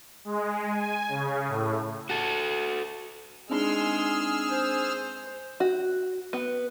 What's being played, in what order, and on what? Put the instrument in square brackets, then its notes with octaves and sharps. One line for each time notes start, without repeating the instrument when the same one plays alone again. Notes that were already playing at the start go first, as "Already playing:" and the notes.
[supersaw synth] G#3
G#5
C#3
A2
[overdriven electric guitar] F#4 A4
[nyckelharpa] G#3 C6 [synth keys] C4 D4 D#4 [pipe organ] G#4 E6 F6
[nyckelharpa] C5
[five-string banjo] F#4
B3